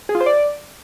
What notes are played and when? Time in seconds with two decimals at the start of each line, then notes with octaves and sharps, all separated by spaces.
0.09 G#4
0.15 F4
0.20 C5
0.26 D5